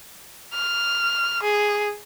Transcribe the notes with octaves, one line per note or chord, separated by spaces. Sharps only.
F6
G#4